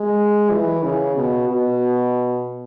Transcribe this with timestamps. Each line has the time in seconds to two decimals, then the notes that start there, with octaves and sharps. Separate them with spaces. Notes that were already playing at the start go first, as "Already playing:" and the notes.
Already playing: G#3
0.51 E3
0.83 C#3
1.16 B2
1.48 B2